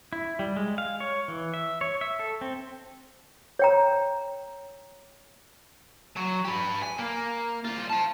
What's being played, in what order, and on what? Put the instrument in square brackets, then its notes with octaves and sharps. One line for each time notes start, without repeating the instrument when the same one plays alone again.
[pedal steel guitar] E4
G3
G#3
F5
C#5
E3
E5
C#5
E5
A4
C4
[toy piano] C#5 G5 A#5
[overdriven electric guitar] F#3
G4 B4
G#5
A#3
C2 F4
F5 A5